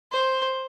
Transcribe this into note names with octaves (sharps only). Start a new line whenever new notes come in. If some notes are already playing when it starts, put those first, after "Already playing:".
C5